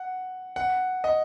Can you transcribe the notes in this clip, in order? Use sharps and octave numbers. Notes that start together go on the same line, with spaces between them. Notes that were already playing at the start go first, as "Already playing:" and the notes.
Already playing: F#5
F#5
D#5